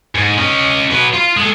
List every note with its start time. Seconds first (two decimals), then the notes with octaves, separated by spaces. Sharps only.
0.15 G#2
0.38 C#4 D#5
0.91 F#3 B4
1.14 F4
1.37 G#3 A4